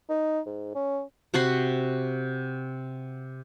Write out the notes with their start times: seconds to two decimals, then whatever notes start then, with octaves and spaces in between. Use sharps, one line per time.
0.09 D#4
0.46 G#2
0.75 C#4
1.34 C3 F#4 B5 C6